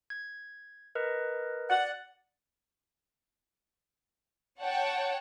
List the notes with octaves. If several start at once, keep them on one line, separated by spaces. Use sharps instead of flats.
G#6
A#4 B4 D#5
D5 F#5
C#5 F#5 G5 A5